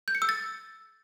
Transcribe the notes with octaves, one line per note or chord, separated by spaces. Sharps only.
G6
C#7
E6
A6